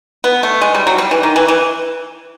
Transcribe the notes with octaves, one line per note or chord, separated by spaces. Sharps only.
B3
A3
G#3
G3
F#3
G3
E3
D#3
E3
E3